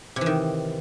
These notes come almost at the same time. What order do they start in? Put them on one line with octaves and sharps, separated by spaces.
C3 E3 D#3